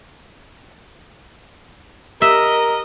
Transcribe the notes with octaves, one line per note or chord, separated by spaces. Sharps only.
G4 A#4 D#5 E5